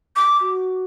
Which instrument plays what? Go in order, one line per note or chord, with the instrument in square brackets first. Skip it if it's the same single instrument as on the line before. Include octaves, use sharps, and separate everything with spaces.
[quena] D6
[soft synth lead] F#4